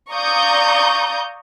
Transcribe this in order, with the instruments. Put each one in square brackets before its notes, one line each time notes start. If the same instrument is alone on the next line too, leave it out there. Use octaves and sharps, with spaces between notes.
[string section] D5 F5 A#5 C#6 D#6 G6